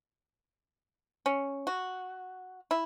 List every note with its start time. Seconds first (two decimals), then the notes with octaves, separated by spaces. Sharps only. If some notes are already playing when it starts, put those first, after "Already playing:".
1.26 C#4
1.67 F#4
2.71 E4